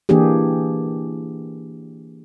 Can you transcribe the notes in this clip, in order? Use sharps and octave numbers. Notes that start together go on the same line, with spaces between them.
E3 A#3 D4 G4 G#4